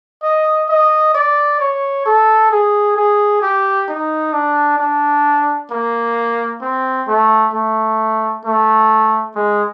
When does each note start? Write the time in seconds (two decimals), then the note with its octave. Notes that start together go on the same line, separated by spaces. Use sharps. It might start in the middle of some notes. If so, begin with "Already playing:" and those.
0.23 D#5
0.69 D#5
1.14 D5
1.60 C#5
2.06 A4
2.51 G#4
2.97 G#4
3.42 G4
3.88 D#4
4.33 D4
4.79 D4
5.71 A#3
6.61 C4
7.07 A3
7.54 A3
8.45 A3
9.35 G#3